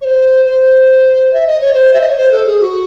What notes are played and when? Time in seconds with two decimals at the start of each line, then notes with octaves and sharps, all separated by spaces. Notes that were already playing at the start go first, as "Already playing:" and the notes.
0.01 C#5
0.05 C5
0.45 C5
1.33 E5
1.47 D#5
1.61 C#5
1.74 C5
1.94 E5
2.01 D#5
2.09 C#5
2.18 C5
2.32 A4
2.46 G#4
2.61 F#4